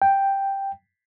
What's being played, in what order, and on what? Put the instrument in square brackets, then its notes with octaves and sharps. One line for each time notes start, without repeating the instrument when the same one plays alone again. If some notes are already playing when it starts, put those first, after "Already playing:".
[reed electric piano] G5